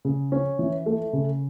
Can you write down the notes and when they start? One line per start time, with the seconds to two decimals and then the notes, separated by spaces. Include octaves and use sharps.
0.05 C#3
0.32 C#4
0.59 E3
0.86 A3
1.13 C#3